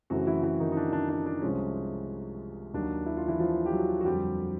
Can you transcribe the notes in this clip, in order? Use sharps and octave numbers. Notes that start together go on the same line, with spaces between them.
F#2 C#3 E3 F#3 A3 C4 F#4
E3 E4
E3 E4
D#3 D#4
D#4
D4
D4
D4
D4
C2 C3 F3 G#3 C#4
D#2 D#3 F#3 D4
E4
F4
E3 E4
F3 F4
G4
F#3 F#4
F#4
F2 D3 F#3 G3 G4